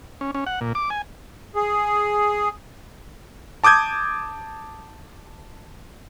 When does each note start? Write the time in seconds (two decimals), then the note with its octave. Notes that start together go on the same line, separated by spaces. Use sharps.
0.21 C#4
0.35 C#4
0.47 F#5
0.61 A#2
0.75 D6
0.90 G#5
1.56 G#4
3.64 A5 D6 D#6 G6 G#6